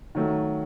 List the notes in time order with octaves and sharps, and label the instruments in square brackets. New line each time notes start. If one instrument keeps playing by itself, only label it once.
[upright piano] D#3 F#3 A3